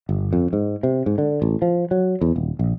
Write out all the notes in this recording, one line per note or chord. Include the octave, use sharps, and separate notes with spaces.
G1
F2
G#2
C3
G#2
D3
A1
F3
F#3
E2
D#1
A#1